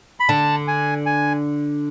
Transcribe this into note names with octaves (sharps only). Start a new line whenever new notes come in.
B5
D3 A5
G#5
G#5